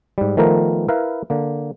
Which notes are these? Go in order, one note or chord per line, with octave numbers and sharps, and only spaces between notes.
G#2 G3
D#3 F3 A3 B3 A#4
E4 A#4 B4 F5
D3 A#3